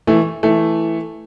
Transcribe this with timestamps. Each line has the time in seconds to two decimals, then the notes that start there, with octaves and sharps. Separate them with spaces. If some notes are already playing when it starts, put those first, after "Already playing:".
0.07 E3 A3
0.43 E3 A3